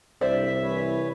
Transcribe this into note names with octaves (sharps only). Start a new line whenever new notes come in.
C2 G2 C5 D5 E5
E3 B4 C#5